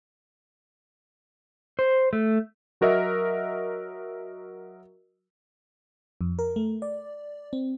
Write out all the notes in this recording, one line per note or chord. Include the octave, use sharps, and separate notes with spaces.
C5
A3
F#3 F#4 A#4 D#5 E5
F2
A#4
A3
D5
C4